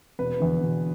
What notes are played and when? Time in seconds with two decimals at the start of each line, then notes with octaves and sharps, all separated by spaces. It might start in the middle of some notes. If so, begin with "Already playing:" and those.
0.19 E1 B4
0.40 E2 D3
0.61 E1